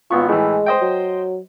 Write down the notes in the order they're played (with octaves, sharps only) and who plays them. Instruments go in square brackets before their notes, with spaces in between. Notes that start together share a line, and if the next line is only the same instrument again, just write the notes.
[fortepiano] G#1 B3 C#6 [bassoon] F4
[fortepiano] A2 E3 [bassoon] G#3
[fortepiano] C5 D#5 G5
[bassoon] F#3